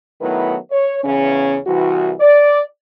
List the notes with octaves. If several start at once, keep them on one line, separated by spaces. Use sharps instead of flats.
D#3 F#3 A3 B3 E4 B4
C#5
E2 C#3 C#4
C2 E3 F#4
D5